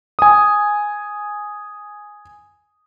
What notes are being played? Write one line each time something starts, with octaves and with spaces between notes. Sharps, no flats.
G#5 D#6